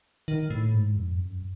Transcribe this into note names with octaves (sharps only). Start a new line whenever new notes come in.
D#3
A2
G#2
F2
F#2